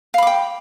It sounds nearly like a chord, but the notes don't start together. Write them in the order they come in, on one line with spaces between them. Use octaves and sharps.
F5 B5 D6 G5